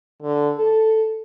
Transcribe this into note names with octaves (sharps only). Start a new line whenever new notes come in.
D3
A4